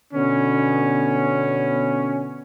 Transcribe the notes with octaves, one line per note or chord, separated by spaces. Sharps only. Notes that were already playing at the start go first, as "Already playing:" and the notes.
B2 D3 B3 C#4